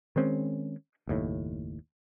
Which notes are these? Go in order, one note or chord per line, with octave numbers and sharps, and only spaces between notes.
D#3 G#3 C4 C#4
F#1 D#2 A2